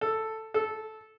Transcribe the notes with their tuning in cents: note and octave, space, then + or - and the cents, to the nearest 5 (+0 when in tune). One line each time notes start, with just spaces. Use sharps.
A4 +5
A4 -10